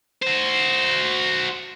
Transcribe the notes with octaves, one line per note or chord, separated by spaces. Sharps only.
F#4 C5